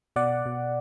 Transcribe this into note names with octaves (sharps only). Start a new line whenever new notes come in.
B2 D5 F#5
B2